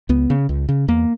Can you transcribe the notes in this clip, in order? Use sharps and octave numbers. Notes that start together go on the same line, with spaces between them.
C#2 B3
C#3
C#2
C#3
E2 A#3